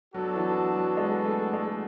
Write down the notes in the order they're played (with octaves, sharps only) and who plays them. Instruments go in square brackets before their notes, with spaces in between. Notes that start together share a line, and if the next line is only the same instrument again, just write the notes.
[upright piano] F#3 [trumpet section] B3 D4 F#4 A4
[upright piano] E3
F#3
F#3
G#3
A3
G#3